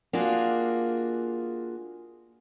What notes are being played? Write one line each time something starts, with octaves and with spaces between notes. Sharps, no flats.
A#3 D4 F4 F#4 G#4